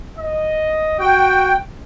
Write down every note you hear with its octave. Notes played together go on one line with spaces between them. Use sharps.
D#5
F#4 G5